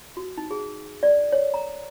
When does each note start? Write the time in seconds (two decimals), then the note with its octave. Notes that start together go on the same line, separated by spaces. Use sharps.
0.17 F#4
0.38 D#4
0.51 G#4
1.03 D5
1.32 C#5
1.54 A#5